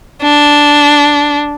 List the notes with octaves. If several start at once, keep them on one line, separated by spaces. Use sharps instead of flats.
D4